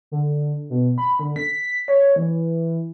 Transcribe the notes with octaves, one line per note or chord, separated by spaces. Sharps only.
D3
B2
B5
D3
B6
C#5
E3